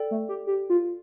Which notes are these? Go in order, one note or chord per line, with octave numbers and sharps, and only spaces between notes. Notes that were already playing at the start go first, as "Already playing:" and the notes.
Already playing: A4 D5 G5
A3
G4
G4
F4